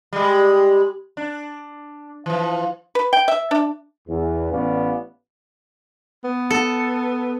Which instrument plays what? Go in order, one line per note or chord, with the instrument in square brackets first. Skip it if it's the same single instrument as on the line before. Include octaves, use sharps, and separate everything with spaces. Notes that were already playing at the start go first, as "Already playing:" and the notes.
[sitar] G3 G#3
D4
E3 F3
[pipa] B4
G5
E5
D4
[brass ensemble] E2
A1 B3 C#4 D5 F5
[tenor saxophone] B3
[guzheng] A4